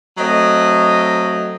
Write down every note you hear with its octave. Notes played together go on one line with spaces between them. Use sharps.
F#3 A3 C4 D#5